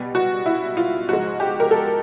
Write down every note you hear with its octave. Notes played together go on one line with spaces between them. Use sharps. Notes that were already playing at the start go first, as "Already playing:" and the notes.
Already playing: B2 G3 B3
F#4
E4
F4
G#2 F3 G#3 F#4
G4
A#4
A4